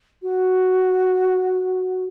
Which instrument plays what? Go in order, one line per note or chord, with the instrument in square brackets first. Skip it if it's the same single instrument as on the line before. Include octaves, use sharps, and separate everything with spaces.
[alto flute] F#4